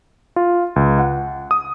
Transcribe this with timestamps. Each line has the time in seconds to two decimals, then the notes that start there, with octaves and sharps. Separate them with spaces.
0.36 F4
0.76 C#2
0.99 F#5
1.51 D#6